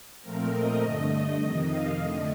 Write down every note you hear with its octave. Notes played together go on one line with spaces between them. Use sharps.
A#2 F3 A3 C4 A#4
D#5
G2 D3 A3
D#5
F2 C3 D#3
F5
F2 D3 A3 D#5